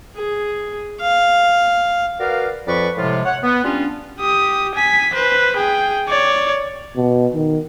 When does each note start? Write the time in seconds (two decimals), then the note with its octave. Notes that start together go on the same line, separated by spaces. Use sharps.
0.16 G#4
1.00 F5
2.20 F#4 A#4 B4 D5 F5
2.67 F2 F3 B4 D5 B5 C#6
2.97 A2 C3 F3 G#3 F4
3.26 C#5 F#5
3.43 B3
3.64 G3 C#4 D4 F4
4.19 G4 D#6
4.75 G#5 B6
5.14 B4 C5
5.57 G#4 G5
6.09 C#5 D5
6.96 B2
7.34 D#3